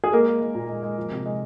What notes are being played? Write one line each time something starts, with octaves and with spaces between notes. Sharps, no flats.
G#4
G#3 A#3 A#4
G#3
G#3
A#2
G#3
G#3
F3
C3
G#3